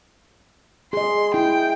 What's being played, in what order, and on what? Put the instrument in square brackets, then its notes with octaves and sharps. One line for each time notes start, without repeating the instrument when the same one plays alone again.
[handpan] G#4 D#5 [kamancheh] C6
[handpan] E4 [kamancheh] G5